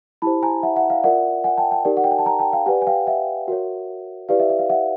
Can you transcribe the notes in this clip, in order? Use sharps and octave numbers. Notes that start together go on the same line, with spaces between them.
E4 G4 C5 A5 B5
G#5 A#5
E5 F#5
E5 F#5
F5
F4 A#4 D5 E5 F#5
F#5 G#5
G5 A5
G5 A5
D#4 G4 A#4 D5
F#5
G5
G#5
A5
G#5 A#5
G5 A5
F5 G5
G4 B4 D5 F#5 G#5
G#5
F5 G5
E5 F#5
F#4 A#4 C#5
E4 G4 B4 D5 F5
E5
E5
F5
E5 F#5